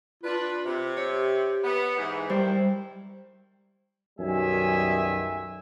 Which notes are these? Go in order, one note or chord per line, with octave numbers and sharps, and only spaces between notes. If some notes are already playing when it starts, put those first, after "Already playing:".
D4 F4 B4
C3
G4 C#5
B3
G#2 E3
D#3 G3 E4 C5
B1 F#2 D#3 G3 E5 G#5